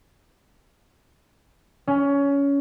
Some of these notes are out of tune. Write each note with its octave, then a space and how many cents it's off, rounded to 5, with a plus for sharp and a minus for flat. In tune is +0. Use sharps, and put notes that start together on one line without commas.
C#4 +20